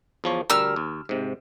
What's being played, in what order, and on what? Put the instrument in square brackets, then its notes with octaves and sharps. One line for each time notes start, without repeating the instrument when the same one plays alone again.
[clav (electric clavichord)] E2 F3 C#5
[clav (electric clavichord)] D2 G3 A#4 [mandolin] E6 F6
[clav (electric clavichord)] D#2
G#2 C3